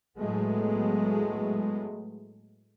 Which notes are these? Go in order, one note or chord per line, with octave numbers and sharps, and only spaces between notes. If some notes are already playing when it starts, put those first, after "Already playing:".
A2 F#3 G#3 A3 B3